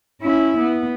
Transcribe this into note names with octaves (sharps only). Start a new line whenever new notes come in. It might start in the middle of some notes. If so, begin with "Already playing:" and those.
C#4 E4
B3